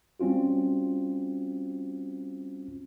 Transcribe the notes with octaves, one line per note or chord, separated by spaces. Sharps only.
G3 C4 C#4 F4 F#4